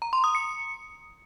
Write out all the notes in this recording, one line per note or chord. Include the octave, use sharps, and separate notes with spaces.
A#5
C6
D#6
C#7